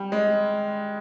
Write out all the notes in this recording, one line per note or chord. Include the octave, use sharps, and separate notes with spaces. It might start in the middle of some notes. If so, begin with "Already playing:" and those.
Already playing: G3
G#3